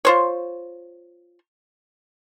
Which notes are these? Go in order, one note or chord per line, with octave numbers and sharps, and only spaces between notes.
F4 C5 C#5